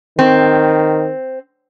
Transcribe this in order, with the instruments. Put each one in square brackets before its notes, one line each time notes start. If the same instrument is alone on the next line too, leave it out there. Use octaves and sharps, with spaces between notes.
[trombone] D#3 [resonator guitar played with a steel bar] C4